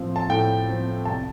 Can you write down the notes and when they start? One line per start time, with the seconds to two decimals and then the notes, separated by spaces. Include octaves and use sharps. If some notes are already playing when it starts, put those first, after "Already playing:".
Already playing: A2 F3 C4
0.16 A5
0.29 A2 G5
0.67 F3 C4
1.05 C2 A5